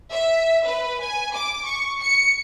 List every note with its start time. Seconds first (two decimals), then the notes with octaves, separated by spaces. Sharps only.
0.12 E5
0.66 B4
1.01 G#5
1.35 D6
1.65 C#6
2.00 C#7